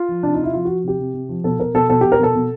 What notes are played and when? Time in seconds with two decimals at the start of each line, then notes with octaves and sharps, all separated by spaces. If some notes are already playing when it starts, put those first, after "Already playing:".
Already playing: F4
0.09 F3
0.23 C3 D4
0.34 D#4
0.39 C3 E4
0.54 F3 F4
0.65 F3 F#4
0.84 C3 G4
0.99 C3
1.14 C3
1.29 F3
1.44 B2 A4
1.59 B2 A#4
1.74 B2 A4
1.90 B2 A4
2.01 B2 G4
2.12 A#4
2.19 B2 A4
2.35 B2